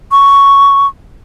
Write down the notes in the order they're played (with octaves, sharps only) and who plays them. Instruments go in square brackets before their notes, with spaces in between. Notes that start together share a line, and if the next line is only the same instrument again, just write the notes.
[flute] C#6